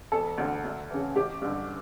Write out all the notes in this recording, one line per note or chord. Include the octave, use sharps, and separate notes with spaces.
E1 A4
D2 D3
D2
C#3 E3
A1 G4
G2 D3